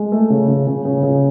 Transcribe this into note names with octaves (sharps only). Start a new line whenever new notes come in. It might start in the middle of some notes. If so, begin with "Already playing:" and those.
Already playing: G#3
A3
C#3
C#3
C#3
C#3
C#3